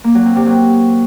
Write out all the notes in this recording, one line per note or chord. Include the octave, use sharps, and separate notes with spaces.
A#3
F#3
C4
C3
F#3